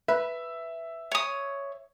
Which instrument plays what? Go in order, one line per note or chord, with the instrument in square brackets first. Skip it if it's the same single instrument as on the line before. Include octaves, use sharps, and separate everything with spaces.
[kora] B4 [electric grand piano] E5
[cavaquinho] C#5 D#6